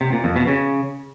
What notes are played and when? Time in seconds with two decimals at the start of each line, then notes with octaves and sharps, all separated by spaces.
0.01 C3
0.12 A#2
0.24 F2
0.36 B2
0.47 C#3